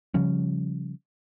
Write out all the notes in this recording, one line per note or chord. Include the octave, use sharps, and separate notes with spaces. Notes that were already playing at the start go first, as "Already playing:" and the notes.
C#3 F3 G3 C#4